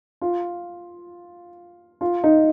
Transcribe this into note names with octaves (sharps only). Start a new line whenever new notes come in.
F4
F4
D#4